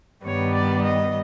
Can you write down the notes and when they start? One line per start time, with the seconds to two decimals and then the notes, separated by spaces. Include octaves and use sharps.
0.24 G2 D#3 G3 B3 C#5
0.54 D5
0.83 D#5